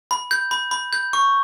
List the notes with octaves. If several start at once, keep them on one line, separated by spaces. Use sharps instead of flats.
B5
G6
B5
B5
G6
C#6